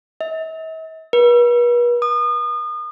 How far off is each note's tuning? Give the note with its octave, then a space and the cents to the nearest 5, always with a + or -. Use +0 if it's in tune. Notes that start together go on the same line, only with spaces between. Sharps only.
E5 -45
B4 -45
D#6 -35